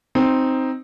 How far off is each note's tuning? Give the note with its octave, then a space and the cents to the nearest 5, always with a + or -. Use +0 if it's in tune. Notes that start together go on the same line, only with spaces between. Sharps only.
C4 +0 D#4 +0